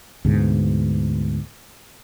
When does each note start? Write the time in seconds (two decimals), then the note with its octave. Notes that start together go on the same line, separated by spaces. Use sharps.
0.25 D2 G#2 B2